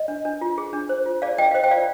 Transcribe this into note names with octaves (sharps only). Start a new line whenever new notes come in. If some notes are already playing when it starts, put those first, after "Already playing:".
Already playing: D#5
D4
D4
F4
G#4
D4
C5
F4
G#4 D5 F5
D4 D#5 G5
F5
C5 D#5
G5
F4 D5 F5